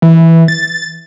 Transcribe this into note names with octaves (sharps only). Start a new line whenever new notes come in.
E3
A6